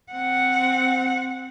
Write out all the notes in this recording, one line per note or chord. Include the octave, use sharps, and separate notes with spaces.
C4 F#5